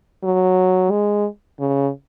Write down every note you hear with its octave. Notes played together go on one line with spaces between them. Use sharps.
F#3
G#3
C#3